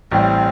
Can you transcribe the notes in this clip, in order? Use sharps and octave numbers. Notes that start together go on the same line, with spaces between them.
A1 A2 G3 C4